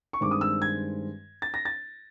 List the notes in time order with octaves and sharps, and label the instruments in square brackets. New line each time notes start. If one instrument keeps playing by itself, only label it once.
[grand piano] C#6
G2 D#3 G#3 C4 D6
D#6
E6
G#6
A6
A#6
A6